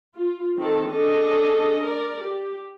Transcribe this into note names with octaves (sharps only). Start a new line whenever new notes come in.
F4
D#3 C4 A4
C#4 D4 G#4 A4 D#5
A#4 D5
G4